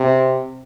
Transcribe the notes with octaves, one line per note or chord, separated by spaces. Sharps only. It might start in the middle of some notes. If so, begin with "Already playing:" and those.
Already playing: C3